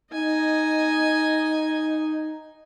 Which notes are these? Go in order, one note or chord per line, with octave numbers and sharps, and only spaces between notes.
D#4 D#5 G#5